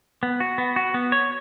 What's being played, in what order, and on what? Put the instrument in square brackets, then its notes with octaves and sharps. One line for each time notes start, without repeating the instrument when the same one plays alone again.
[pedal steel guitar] B3
F#4
B3
F#4
B3
C#5